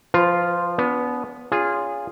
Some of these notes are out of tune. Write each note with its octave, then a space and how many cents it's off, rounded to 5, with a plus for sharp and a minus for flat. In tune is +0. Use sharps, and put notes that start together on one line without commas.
F3 +0 F4 +0 B4 +35
B3 +0 D4 -40
C#4 +35 F4 +0 G#4 -15